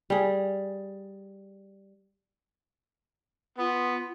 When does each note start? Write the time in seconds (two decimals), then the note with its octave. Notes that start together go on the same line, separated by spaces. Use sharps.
0.10 G3 G#4
3.58 B3 F4